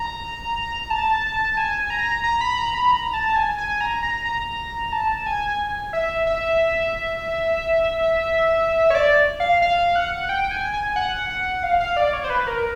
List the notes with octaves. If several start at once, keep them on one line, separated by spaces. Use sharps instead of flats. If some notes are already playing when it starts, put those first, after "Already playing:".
Already playing: A#5
A5
G#5
A#5
A#5
B5
A#5
B5
A#5
A5
G#5
G#5
A#5
A#5
A#5
A5
G#5
E5
E5
C#5
D5
F5
F5
F#5
G5
G#5
G#5
F#5
F#5
F5
F5
D5
C#5
C5
B4
A#4